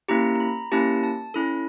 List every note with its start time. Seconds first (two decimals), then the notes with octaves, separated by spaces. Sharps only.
0.08 A#3 C#4 E4 G4 A#5
0.35 A#5
0.40 B5
0.72 A#3 C#4 E4 G4 A5
1.03 A5
1.34 C#4 E4 A4